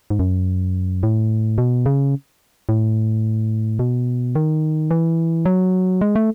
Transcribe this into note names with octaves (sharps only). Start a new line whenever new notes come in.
G#2
F#2
A2
B2
C#3
A2
B2
D#3
E3
F#3
G#3
A3